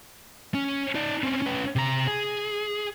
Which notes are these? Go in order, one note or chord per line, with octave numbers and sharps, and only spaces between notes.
C#4
D#4 D5
C4 C#4
C#4 B4
C3 A#5
G#4